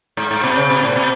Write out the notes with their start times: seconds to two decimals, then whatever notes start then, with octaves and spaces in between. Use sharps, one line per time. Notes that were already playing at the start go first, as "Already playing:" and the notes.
0.17 G#2
0.31 G#2
0.43 B2
0.57 C#3
0.70 B2
0.83 A2
0.96 B2